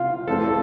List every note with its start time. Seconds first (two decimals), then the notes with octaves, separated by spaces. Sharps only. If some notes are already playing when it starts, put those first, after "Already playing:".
Already playing: C3 C4 F4
0.27 E3 A3 C4 A4
0.44 A4